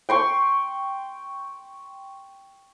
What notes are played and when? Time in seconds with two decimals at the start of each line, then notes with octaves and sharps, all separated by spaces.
0.09 G5 C6 C#6